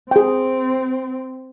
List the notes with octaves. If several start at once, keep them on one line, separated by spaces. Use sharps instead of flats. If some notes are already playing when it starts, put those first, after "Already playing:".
C4 G#4 G5